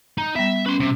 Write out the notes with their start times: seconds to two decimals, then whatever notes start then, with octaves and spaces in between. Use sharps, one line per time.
0.18 D#4
0.35 G3 B3 E5
0.66 C#4 B4 C6
0.80 C3